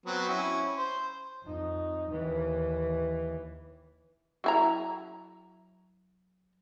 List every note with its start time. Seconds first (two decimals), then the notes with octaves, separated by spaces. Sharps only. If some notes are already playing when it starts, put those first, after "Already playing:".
0.06 F#3 B3 C4
0.29 C#4 E4
0.77 C5
1.43 F2 D#4
2.09 D#2 E3
4.44 F#3 E4 A#5